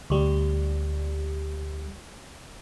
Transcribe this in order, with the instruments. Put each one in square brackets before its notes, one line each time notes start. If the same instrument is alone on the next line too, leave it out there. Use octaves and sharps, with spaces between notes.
[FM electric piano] D2 G3